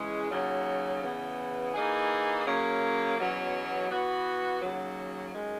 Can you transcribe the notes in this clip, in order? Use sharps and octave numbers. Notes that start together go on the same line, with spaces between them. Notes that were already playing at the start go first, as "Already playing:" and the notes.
Already playing: C#3 E3 G#3 C#4 G#4
D#2 C#3 F#3
E2 C#3 E3 B3
E3 A#3 D#4 G#4
C#3 F#3 A#3
E2 B2 F#3 C#4
E3 B3 F#4
D#2 C#3 F#3
F#2 D#3 G#3